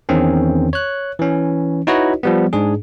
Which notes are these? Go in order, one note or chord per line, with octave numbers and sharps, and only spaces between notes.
E2 D#3 C4 C#4
C#5 F#6
E3 C#4
D#4 E4 F#4 B4 C#5 D#5
F3 G3 B3
G#2 D4 G#4